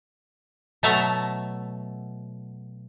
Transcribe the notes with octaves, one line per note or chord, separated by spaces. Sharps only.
B2 F#3 A3 E5 A5 A#5